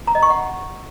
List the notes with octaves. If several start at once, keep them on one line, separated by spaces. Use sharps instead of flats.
A#5
D#5
C#6
F#5